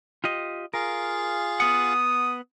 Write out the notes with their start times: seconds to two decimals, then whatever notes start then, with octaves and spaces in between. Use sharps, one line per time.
0.24 F4 G4 D#5
0.74 F4 G#4 A#4 F5
1.60 B3 F#5 D#6